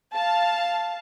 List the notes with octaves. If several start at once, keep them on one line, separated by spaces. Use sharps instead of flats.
F5 A5